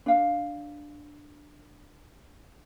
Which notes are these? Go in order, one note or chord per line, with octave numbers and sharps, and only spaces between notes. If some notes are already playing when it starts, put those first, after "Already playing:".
D4 F5